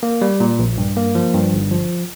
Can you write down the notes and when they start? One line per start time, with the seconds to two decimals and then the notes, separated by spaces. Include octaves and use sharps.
0.03 A#3
0.22 G3
0.40 A#2
0.59 A#1
0.78 G2
0.97 A#3
1.15 F3
1.34 G2
1.53 G1
1.71 F3